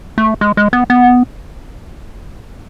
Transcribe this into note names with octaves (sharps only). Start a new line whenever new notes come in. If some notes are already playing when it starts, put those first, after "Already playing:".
A3
G#3
G#3
B3
B3